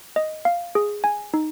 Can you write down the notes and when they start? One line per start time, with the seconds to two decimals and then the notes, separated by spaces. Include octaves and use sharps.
0.16 D#5
0.45 F5
0.75 G#4
1.04 G#5
1.34 D#4